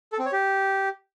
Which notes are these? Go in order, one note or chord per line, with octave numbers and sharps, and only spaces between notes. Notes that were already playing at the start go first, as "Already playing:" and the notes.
A4
C4
C#5
G4